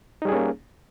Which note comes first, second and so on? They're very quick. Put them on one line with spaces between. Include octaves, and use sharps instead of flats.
D#4 G3 G#4 C#4 A#3